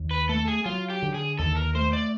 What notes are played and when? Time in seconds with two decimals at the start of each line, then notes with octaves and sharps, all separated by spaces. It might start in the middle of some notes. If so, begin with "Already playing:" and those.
Already playing: D#2
0.11 B4
0.29 A3 A4
0.48 G#4
0.65 F#3 F4
0.90 G4
1.02 D3
1.14 G#4
1.39 D#2 A4
1.57 A#4
1.75 A3 C5
1.93 D5